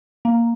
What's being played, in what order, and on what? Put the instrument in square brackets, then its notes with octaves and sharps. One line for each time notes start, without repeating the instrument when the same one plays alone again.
[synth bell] A#3